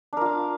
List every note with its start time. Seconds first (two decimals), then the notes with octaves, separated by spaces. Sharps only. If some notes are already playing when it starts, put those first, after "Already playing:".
0.13 D4
0.17 A#4
0.21 F4
0.26 F5